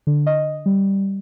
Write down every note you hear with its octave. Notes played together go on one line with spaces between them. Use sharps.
D3
D#5
G3